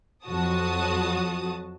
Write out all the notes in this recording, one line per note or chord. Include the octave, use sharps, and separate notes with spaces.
F2 F#3 F#4 A5 D#6